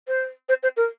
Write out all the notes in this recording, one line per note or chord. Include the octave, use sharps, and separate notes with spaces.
C5
C5
C5
A#4